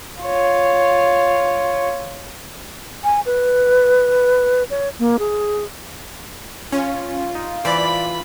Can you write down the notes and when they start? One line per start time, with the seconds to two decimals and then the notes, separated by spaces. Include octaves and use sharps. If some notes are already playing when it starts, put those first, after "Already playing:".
0.22 F4 C#5
3.04 G#5
3.26 B4
4.70 C#5
4.99 A#3
5.19 G#4
6.72 C#4 F4
7.35 D#4
7.65 E3 C5 D5 B5